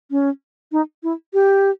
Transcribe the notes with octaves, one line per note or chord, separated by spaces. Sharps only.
C#4
D#4
E4
G4